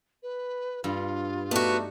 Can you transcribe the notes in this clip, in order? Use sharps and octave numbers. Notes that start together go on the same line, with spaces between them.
B4
G2 F4
A3 B3 D4 D#4 F#4